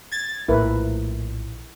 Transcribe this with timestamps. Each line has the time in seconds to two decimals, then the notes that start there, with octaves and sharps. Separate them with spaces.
0.12 G#6 A6
0.48 A#1 A2 E4 A#4 B4